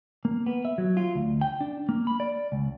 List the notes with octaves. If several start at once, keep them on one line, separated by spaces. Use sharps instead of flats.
A#3
B3
E5
F#3
F4
D2
G5
D4
A#3
B5
D5
C#2